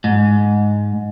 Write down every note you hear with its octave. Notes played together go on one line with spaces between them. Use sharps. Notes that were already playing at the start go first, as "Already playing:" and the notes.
G#2